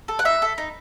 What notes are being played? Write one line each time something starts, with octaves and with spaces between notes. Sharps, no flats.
A4
F#5
D#4 E5
A4
D#4